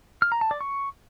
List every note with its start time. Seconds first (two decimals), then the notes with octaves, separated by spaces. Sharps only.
0.22 F6
0.32 A#5
0.41 A5
0.51 D5
0.61 C#6